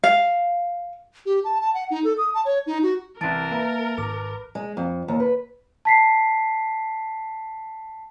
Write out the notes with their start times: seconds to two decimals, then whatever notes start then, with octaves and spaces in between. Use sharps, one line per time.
0.04 F5
1.26 G4
1.44 A5
1.61 A5
1.74 F#5
1.91 D#4
2.04 A4
2.18 D#6
2.34 A5
2.45 C#5
2.67 D#4
2.83 F#4
3.21 C2 E3 A#4 A5 A6 D7
3.51 A#3 B4 E5 A#5
3.98 G#1 D6
4.55 G#3
4.77 F2
5.08 D#2
5.20 B4
5.85 A5 B6 C7